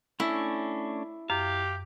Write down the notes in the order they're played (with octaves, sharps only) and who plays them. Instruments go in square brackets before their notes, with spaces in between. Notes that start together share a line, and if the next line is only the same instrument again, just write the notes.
[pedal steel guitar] A3 C#4 D4 [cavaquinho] E4
[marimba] F#2 [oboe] G4 [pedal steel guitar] F5